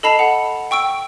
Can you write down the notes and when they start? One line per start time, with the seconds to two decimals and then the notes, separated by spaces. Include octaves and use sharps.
0.03 A4 D#5 A5 B5 C7 F7
0.19 F#5
0.71 G5 C#6 E6 D7